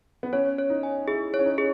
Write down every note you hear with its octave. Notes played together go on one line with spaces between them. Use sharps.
B3
C#4 C#5
C#5
D#4
G#5
E4 G#4
C#5
C#4
D#4
G#4